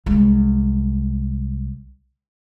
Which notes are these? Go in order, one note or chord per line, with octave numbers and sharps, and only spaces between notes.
C2 G#3